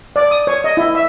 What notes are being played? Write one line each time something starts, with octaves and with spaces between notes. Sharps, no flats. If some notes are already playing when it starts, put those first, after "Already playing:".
D5
D#6
C#5
D#5
E4
E5